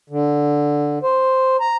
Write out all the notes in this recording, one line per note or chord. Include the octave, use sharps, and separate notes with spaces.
D3
C5
A#5